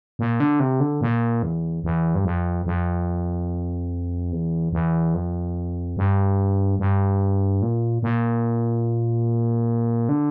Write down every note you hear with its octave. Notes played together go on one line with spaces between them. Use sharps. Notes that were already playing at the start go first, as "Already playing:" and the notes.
A#2
D3
C3
D3
A#2
E2
E2
G2
F2
F2
E2
E2
F2
G2
G2
A#2
A#2
D3